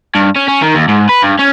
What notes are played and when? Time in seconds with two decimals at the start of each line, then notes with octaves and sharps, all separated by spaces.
0.15 G2
0.36 C#4
0.48 C#4
0.62 D#3
0.75 D#2
0.88 G#2
1.09 B4
1.22 G2
1.39 C#4